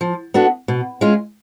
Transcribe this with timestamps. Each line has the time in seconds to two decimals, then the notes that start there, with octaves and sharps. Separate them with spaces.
0.01 F3
0.34 B3 D4 F#4 A4
0.68 B2
1.01 G#3 C#4 F4